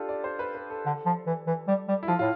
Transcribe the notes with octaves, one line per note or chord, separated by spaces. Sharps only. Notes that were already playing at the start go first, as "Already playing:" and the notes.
Already playing: D4 F4 G4 A4
D5
C5
B4
B4
A4
D3
F3
E3
E3
G3
G3
E4
F3 F4
A2 F4